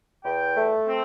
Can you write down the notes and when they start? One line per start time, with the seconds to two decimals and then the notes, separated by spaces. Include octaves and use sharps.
0.25 E2 G5
0.56 A3
0.87 C4